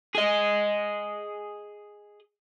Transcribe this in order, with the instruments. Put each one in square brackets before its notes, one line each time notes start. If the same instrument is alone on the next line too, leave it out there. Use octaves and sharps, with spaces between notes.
[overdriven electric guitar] G#4 D#5